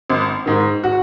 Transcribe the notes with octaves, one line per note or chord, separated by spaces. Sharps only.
G#1
G#2 D#3
F#4